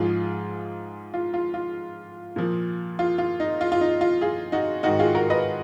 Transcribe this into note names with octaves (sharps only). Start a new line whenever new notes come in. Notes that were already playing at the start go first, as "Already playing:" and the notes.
Already playing: G#2 F3 F4 G#4
F4
F4
F4
A#2 F3
F4
F4
D#4
F4
F4
D#4
F4
F4 G#4
D#4 F#4
G#2 D#3 D#4 F#4
F4 G#4
F#4 A#4
B4 D#5